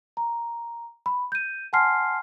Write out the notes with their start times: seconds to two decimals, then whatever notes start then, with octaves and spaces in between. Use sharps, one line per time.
0.17 A#5
1.06 B5
1.32 G6 D#7
1.73 F#5 G#5 A5 C6 F6 C7